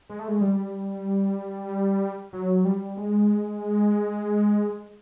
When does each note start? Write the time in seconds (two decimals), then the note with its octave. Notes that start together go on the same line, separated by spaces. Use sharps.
0.10 G#3
0.19 A3
0.28 G#3
0.41 G3
2.33 F#3
2.65 G3
2.97 G#3